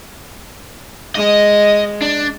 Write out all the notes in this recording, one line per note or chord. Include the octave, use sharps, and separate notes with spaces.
G#3 D#5
D4